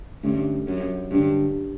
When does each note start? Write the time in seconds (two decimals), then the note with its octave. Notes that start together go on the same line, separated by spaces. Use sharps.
0.23 G2 D3 A3 C#4
0.67 F#2
1.11 G2 D3 G3 D4